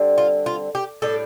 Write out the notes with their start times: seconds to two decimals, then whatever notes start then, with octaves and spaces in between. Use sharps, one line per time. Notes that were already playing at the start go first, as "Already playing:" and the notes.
Already playing: D3 G3 C4
0.18 F4
0.46 F4
0.75 G4
1.02 A2 G3 D4 A4